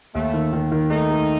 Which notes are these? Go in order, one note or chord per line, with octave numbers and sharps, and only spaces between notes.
D#2 A3
D#3
D#3
D#3
A3 D#4
A3